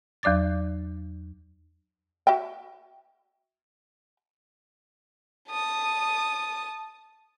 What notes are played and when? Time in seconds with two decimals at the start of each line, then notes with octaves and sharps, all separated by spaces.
0.23 E2 F#3 D5 D6 A6
2.27 F#4 E5 G5
5.50 A5 D#6